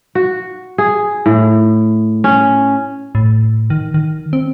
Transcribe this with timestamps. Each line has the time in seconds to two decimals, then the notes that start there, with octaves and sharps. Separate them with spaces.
0.15 F#4
0.78 G#4
1.26 A2
2.24 C#4
3.15 A2
3.70 D#3
3.94 D#3
4.33 C4